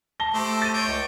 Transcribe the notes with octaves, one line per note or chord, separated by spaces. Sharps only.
A5 A#6 G7
A3 G4 A4 C5
A6 D#7
C#5 D6 G6
C#2